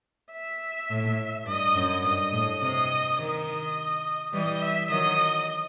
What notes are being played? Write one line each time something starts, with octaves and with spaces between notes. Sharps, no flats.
E5
A2
G2 D#5
F#2
G2 D#5
A2
C3 D#5
D#3 D#5
E3 G3 D#5
E5
D#3 F#3 D#5